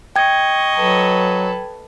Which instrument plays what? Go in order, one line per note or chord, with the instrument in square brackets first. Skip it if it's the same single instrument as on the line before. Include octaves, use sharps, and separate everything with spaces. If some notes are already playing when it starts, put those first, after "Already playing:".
[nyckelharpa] D#5 C#6 [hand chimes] G5 G#6
[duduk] F#3 [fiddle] A4 B4